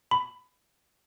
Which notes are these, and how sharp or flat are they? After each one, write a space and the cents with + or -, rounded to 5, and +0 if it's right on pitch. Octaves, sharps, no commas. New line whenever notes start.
B5 +15